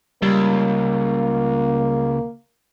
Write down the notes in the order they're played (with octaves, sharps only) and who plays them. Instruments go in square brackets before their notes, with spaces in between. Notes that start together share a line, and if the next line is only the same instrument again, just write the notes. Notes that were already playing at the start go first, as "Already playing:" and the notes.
[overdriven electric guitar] C#2 [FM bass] G3 [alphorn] A#3